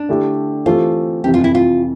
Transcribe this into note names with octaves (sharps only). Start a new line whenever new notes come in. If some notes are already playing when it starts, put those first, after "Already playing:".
Already playing: D4
D3 A3 E4 G4
E3 A3 C4 F4 G4
F2 C3 E3 G4
F4
E4
F4